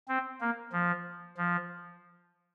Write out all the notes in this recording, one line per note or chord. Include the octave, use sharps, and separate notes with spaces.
C4
A#3
F3
F3